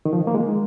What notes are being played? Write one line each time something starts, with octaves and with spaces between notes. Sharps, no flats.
D#3
F3
D#3
A#3
G#3